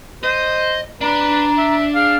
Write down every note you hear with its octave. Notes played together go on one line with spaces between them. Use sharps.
C5 D#5
D4 B4 A#5
E5
G#4 F5